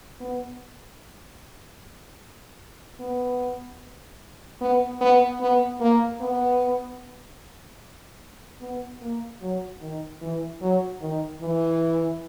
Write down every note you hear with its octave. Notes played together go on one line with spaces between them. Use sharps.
B3
B3
B3
B3
B3
A#3
B3
B3
A#3
F#3
D#3
E3
F#3
D#3
E3